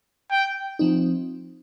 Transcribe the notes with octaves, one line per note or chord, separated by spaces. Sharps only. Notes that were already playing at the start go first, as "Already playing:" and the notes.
G5
F3 C4 D#4